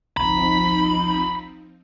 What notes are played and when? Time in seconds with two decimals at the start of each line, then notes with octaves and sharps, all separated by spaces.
0.17 G1 C2 F3 C4 D#4 A#5 B5